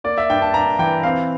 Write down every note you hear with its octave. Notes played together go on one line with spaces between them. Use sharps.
A#3 D5
E5
G2 G5
A5
G2 A#5
E3 G5
C4 F5